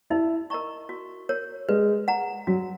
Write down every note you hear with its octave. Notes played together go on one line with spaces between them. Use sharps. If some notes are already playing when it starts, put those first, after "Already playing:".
D#4 E4
A#4 D#5 A#5 C#6
F#4
A#4 C#5
G#3 B4
F#5 A#5
F#3 F#4